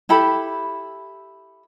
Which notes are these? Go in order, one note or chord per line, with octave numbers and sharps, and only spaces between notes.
E4 G4 A4 B5